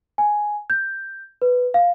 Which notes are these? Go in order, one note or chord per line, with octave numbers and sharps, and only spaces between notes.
G#5
G6
B4
F5